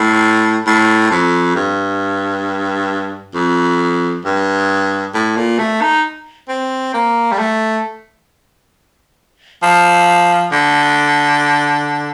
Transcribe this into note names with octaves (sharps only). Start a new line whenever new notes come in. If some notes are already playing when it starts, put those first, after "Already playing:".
Already playing: A2
A2
F2
G2
F2
G2
A2
A#2
A3
D#4
C4
A#3
G3
A3
F3
D3